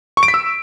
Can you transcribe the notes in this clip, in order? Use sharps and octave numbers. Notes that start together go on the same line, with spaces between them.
C#6
D7
B6
E6